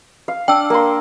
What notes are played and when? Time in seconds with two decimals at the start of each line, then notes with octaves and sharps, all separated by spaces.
0.28 F5
0.48 D4 G5 E6
0.70 A#3 C6